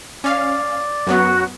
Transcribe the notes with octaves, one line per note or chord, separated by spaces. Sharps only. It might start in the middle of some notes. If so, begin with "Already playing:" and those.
C#4 D5 F5
F#2 F#3 B3 F#4